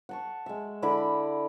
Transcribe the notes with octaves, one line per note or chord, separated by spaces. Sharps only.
F#5 A5 C#6
G#3 E5
D3 E4 D5 B5